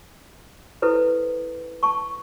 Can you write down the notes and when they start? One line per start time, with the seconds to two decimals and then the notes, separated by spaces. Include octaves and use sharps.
0.82 E4 A4 B4 C5
1.83 A5 C#6